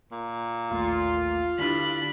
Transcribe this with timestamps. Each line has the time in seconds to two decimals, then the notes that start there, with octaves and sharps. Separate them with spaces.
0.12 A#2
0.71 A1 D#2 A3 F4
1.59 G2 D3 D4 E4 B5